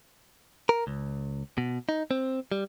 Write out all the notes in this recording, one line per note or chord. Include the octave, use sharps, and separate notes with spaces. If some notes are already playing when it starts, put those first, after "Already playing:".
A#4
C#2
B2
D#4
C4
G3